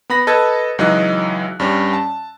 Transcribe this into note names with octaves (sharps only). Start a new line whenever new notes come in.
B3 B5 A#6
A4 B4 D#5 E6 G#6 A6
C#2 E3 F#3 D#4 D#5 F#6
G2 G3 C#4
A5